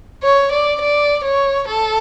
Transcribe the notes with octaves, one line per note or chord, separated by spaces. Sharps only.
C#5
D5
D5
C#5
A4